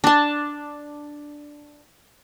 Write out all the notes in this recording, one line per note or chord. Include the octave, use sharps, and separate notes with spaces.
D4 A5